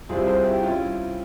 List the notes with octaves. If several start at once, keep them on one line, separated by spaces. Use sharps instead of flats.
C2 C3 G3 C4 E4 F4 G#4
G#4 C5
E4 G4
G3 C#4 E4 F4